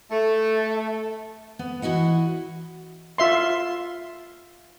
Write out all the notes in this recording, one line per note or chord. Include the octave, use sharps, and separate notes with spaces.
A3
B3
E3 E4 F#4 D#5 F#5
F4 E5 C6